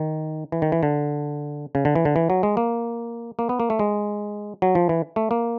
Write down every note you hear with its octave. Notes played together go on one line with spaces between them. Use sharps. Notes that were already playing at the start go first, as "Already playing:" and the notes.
Already playing: D#3
E3
D#3
E3
D3
C#3
D3
E3
D3
E3
F#3
G#3
A#3
A#3
B3
A#3
A3
G#3
F#3
F3
E3
A3
A#3